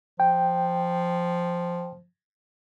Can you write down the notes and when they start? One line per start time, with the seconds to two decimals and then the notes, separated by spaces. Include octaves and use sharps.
0.20 F3 G5